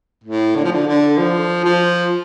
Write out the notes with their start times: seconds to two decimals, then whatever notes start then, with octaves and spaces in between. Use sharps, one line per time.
0.24 A2
0.56 D3
0.64 F3
0.72 D3
0.87 D3
1.18 F3
1.64 F3